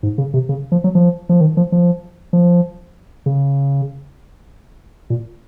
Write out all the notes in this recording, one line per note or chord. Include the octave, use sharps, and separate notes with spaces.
G#2
C#3
C3
C#3
F3
F#3
F3
F3
D#3
F3
F3
F3
C#3
A#2